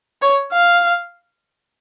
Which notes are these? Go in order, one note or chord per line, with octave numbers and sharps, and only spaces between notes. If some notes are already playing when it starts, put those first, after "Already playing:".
C#5
F5